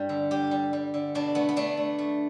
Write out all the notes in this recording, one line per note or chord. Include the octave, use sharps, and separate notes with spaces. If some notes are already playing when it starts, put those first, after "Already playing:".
Already playing: G2 G3
D3
G3 G4
G3
G3
D3
B2 D4
A3 B3
B3
A3 D4
A3
A3